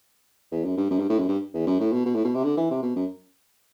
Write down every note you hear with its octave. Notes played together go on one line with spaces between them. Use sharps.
E2
F#2
G2
F#2
G2
A2
F#2
G2
E2
F#2
A2
B2
B2
A2
B2
C3
D3
E3
C3
B2
F#2